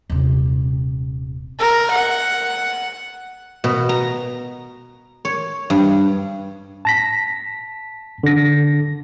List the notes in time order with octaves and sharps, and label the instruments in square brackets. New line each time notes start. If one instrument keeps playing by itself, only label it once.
[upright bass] D#1 C3
[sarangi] A#4
F#5
[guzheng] B2
A#5
C#5
G2
[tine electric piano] A5 A#6 B6
D3 A#6